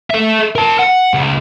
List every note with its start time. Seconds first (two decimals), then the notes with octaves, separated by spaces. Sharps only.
0.11 A4 E5
0.56 A#4 A5
0.79 F#5
1.14 C#2